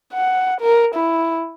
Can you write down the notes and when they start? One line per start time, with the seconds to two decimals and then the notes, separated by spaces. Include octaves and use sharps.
0.13 F#5
0.61 A#4
0.94 E4